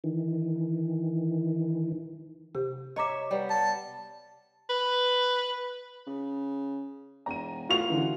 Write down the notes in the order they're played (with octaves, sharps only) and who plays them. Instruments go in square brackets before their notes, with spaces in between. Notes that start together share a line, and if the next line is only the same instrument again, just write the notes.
[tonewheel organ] D#3 E3
[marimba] C3 G4
[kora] C#5 E5 [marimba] D#5 A#5 D6
[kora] G3 B3
[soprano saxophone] A5
B4
[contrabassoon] C#3
[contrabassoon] E1 [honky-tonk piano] A#5 D#7
[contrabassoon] A2 [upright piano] F4 F#4 F7
[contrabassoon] C#2 [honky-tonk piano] D3 E3 E4